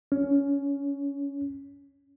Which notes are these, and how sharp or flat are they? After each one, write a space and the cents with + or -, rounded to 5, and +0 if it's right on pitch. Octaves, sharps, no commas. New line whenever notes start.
C#4 +15